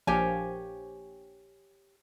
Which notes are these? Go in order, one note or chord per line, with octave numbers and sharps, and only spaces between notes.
A#1 F3 G4 C#5 G#5